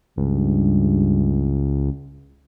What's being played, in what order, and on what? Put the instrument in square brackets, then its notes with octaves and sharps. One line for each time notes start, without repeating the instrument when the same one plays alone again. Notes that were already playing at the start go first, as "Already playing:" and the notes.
[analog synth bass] C#2 [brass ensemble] G2